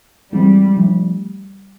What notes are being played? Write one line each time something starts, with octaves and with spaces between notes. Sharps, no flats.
E3 G3 G#3 C4
F3 A3 D4